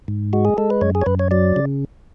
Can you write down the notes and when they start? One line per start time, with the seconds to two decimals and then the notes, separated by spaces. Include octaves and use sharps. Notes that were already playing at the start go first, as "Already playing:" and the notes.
0.08 G#2
0.33 G#3 F#4
0.45 G#4
0.58 G#3 A4
0.70 B4
0.81 F#2 C#5
0.95 G#4
1.02 C#5
1.06 F#2 B4
1.19 C#5
1.31 F#3 D5
1.56 C#3